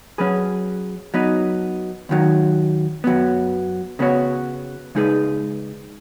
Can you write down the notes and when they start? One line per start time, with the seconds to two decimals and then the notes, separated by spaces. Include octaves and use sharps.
0.18 F#3 C#4 G#4 B4
1.14 F#3 B3 D#4 B4
2.09 D#2 D#3 F#3
3.04 F#2 F#3 B3
3.99 C#3 B3 F#4 C#5
4.95 C#3 G#3 D#4 G#4 B4